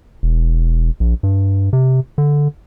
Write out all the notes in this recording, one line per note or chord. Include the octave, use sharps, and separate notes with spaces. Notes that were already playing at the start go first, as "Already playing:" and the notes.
E1
A#1
G2
C3
D3